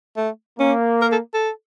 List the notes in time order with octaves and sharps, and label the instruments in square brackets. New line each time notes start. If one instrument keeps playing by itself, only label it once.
[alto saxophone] A3
[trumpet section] A#3 [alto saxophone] C#4
[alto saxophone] A#4
A4
A4